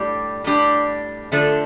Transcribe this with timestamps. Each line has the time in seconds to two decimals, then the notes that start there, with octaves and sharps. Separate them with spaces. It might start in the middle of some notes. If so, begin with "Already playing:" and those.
Already playing: A2 G3 D4 G4
0.44 A2 G3 D4 G4
1.32 D3 F3 A3 D4 A4